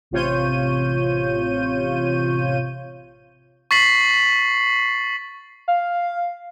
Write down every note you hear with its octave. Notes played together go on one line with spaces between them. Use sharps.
A1 C3 F4 C#5 G6 D#7
C#6 A6 B6 C7 F#7
F5